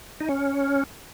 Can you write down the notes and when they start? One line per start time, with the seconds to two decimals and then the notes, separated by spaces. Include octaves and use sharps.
0.20 D#4
0.29 C#4